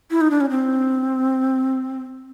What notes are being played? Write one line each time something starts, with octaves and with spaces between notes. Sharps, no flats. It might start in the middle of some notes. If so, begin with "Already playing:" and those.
E4
D#4
D4
C#4
C4